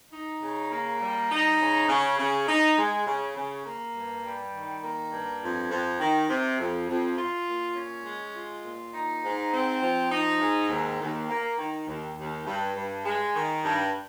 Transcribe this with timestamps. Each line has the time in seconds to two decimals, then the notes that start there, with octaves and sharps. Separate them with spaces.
0.12 D#4
0.41 C#3
0.71 A#3
1.00 G3
1.30 D#4
1.59 C#3
1.88 C#3
2.18 C#3
2.47 D#4
2.77 G#3
3.05 C#3
3.36 C#3
3.65 A#3
3.94 G2
4.24 G3
4.53 D#3
4.82 A#3
5.11 G2
5.41 F2
5.70 F2
5.99 D#3
6.29 C3
6.59 F2
6.88 F2
7.17 F4
7.47 A#2
7.76 C#4
8.05 G#3
8.35 F4
8.64 A#2
8.93 D#4
9.23 G#2
9.52 C4
9.81 F3
10.10 D#4
10.40 G#2
10.69 D#2
11.00 D#2
11.29 A#3
11.58 D#3
11.87 D#2
12.17 D#2
12.46 G2
12.75 G2
13.04 G#3
13.34 D#3
13.63 G2